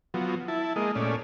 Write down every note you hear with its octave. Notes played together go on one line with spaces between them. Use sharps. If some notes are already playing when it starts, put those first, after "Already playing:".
F3 F#3 B3
E4 A5
G#3 A#3 D#5
A#2 A3 C#4 D5